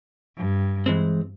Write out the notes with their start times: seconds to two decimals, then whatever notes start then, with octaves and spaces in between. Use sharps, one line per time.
0.36 G2
0.86 E3 G#3 C4